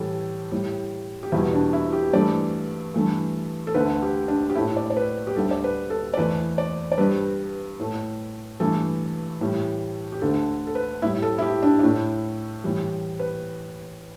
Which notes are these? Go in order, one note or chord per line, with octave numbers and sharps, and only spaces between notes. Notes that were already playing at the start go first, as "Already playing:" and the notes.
Already playing: A2 E3 G3 A4
A2 G3
G4
E2 B2 G3 E4
D4
E4
G4
G2 E3 A3 D5
G2 E3 A3
A4
D2 D3 A3 B4
G4
D4
G4
A2 A3 E4
D5
D5
B4
G4
D2 D3 G3 A4
D5
B4
A4
D5
E2 E3 A3 B4
D5
D5
G2 G3 B4
A2 A3
G2 E3 A3 A4
A2 E3 G3
G4
D2 D3 A3 A4
A4
B4
A2 G3 E4
A4
E4
G4
D4
D4
A2 A3 E4
A2 E3 G3
B4